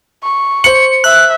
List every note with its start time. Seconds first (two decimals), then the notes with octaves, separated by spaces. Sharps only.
0.23 C#6
0.64 C5 C#7 F#7
1.04 E5 F#6